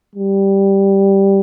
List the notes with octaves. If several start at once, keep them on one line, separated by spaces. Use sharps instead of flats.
G3